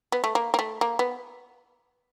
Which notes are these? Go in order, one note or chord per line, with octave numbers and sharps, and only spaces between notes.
B3
A3
A#3
A#3
A3
A#3
B3